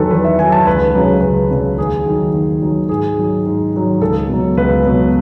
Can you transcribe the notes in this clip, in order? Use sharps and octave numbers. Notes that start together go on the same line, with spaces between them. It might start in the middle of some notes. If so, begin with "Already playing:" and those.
Already playing: E2 D#3 F#3 A4 B4
E2 B4
E5
D#3 F#3 G#5
A5
C#2 B4
C#3 F#3
C#2 B4
C#3 F#3
D#2 G#4
D#3 F#3
D#2
D#3 F#3
G#2 G#4
D#3 F#3
G#2
D#3 F#3
C#2 A4
B2 F#3
C#2 B4
B2 F#3